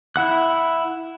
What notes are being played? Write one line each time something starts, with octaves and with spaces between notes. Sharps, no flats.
E4 F#5 F#6